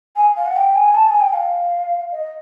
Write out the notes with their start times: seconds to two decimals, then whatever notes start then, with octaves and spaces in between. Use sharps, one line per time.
0.16 G#5
0.36 F5
0.46 F#5
0.56 G5
0.75 G#5
0.94 A5
1.08 G#5
1.21 G5
1.33 F5
2.12 D#5